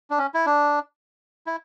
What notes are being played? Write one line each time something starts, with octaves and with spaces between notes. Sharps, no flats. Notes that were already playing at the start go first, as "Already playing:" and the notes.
D4
C#4
E4
D4
E4